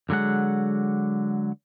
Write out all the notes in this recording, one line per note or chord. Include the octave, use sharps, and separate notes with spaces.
F2 D3 F#3 G#3 F#5